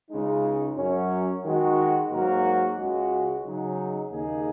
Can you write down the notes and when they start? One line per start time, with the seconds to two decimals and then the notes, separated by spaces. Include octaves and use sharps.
0.10 C#2 C#3 G#3 D#4
0.76 F#2 F#3 C#4
1.44 D#3 G#3 F#4
2.10 G#2 F#3 A#3 F#4 A#4
2.77 C#2 C#3 G#3 F#4
3.44 C#3 F#3 D#4 G#4
4.10 D#2 C#3 A#3 D#4 G#4